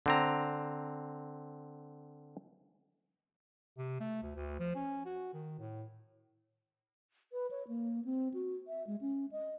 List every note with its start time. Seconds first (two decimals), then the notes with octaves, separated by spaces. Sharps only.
0.06 D3 C4 A#5
3.78 C3
4.00 A3
4.23 D2
4.35 D2
4.59 F3
4.75 C#4
5.05 F#4
5.34 D#3
5.59 A2
7.33 B4
7.51 C#5
7.68 A#3
8.05 C4
8.34 F#4
8.68 E5
8.87 G#3
9.01 C#4
9.32 D#5